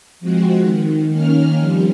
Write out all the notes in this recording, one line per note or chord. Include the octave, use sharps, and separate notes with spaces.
F3 G#3 C4 F#4
D#3
D#3 A#3 C#4 F6
F3 G3 C4